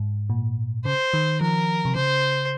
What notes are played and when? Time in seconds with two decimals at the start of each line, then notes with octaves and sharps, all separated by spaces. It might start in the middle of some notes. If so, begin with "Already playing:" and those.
Already playing: G#2
0.30 A#2
0.85 C#3 C5
1.14 D#3
1.41 F3 A#4
1.85 C3
1.96 C#3 C5